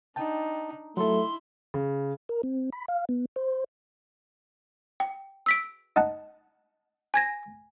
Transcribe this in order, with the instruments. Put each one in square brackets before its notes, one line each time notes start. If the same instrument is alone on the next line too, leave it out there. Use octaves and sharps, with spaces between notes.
[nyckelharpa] D4 D#4 [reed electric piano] G5 A5
[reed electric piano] F#3 A4 [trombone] A3 [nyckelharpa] E4 [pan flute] C6
[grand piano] C#3
[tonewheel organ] A#4
C4
B5
F5
B3
C5
[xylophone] G5
E6 B6 D7
[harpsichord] D#4 F#5 A5
[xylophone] G#5 G#6 A#6